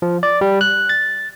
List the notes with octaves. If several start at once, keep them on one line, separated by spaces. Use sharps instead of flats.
F3
D5
G3
F#6
A6